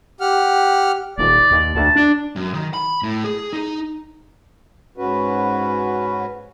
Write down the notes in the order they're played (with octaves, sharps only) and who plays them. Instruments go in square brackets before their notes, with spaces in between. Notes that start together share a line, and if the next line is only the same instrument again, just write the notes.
[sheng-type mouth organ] G4 F#5 F6
[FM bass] D#1 [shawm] D5
[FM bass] D#2
[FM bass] D2 [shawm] A5
[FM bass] D4
[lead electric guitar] F#2
D#3
B5
A2
G#4
D#4
[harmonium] G#2 C#4 F#4 B4